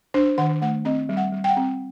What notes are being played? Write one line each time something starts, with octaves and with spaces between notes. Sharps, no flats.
D4 C5
D#3 F#5
A3 F#5
C4 D#5
G3
F#5
G3
G5
F#5
C4